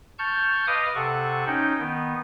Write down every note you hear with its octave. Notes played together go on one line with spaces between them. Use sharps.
A5 C#6 F6 G6
B4 D#5 F5 D6 D#6 F6
C3 A4 F#5 C#6
C#4 D#4 G5
D#3 B3